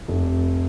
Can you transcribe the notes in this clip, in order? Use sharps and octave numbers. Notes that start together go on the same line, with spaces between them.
F1